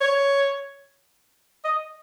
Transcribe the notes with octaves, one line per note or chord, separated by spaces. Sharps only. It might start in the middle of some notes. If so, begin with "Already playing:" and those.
C#5
D#5